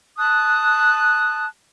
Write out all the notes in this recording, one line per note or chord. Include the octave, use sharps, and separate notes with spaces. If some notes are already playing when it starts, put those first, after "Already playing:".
A5 D#6 F#6